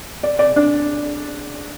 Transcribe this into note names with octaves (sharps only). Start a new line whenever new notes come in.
D5
D5
D4